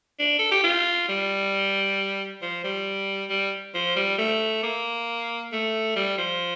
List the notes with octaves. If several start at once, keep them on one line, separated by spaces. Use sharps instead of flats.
D4
A4
G4
F4
G3
F3
G3
G3
F3
G3
A3
A#3
A3
G3
F3